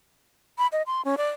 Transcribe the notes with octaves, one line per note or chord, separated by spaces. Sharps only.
B5
D#5
C6
C#4
D5